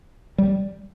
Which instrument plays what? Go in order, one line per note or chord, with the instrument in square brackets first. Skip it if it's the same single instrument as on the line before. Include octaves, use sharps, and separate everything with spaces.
[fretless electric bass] G3